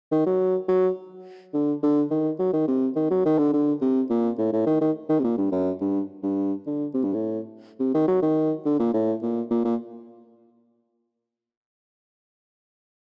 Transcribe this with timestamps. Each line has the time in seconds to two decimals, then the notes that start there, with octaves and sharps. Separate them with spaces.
0.12 D#3
0.26 F#3
0.68 F#3
1.54 D3
1.83 D3
2.11 D#3
2.39 F#3
2.53 D#3
2.68 C3
2.96 D#3
3.11 F#3
3.25 D#3
3.38 D3
3.53 D3
3.81 C3
4.10 A#2
4.38 A2
4.53 A2
4.66 D#3
4.81 D#3
5.09 D#3
5.19 C3
5.24 A#2
5.38 G2
5.52 F#2
5.81 G2
6.23 G2
6.66 D3
6.94 C3
7.04 G2
7.14 A2
7.80 C3
7.94 D#3
8.08 F#3
8.22 D#3
8.65 D3
8.79 A#2
8.94 A2
9.22 A#2
9.51 A#2
9.65 A#2